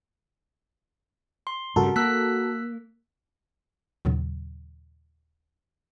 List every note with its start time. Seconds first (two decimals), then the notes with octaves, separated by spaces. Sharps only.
1.47 C6
1.76 G2 C#3 G3 F#4 A4 A#4
1.96 A#3 E6 F#6 B6
4.05 D#2 A#2 C#3 F#3